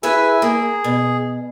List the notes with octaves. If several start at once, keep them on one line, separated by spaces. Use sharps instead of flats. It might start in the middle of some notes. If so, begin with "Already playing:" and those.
E4 G#4 B4 E5 G#5 E6
A#3 G#4
B2